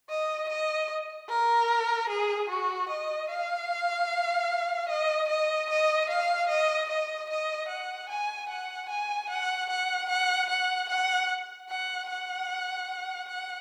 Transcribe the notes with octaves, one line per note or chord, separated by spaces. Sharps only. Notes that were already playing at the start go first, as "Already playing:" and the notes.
D#5
D#5
A#4
G#4
F#4
D#5
F5
D#5
D#5
D#5
F5
D#5
D#5
D#5
F#5
G#5
F#5
G#5
F#5
F#5
F#5
F#5
F#5
F#5
F#5
F#5